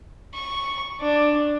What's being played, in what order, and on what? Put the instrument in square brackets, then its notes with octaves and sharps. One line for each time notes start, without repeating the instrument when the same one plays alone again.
[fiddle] C#6
D4